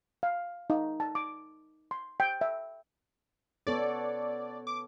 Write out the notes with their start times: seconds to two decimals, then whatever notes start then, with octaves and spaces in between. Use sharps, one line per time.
0.23 F5
0.70 D#4
1.00 A5
1.15 D6
1.91 C6
2.20 G5
2.41 E5
3.67 B3 A4 C#5 D5
4.67 D6